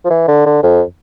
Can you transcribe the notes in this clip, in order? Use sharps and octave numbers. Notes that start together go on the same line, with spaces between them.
F3
E3
D3
D3
F2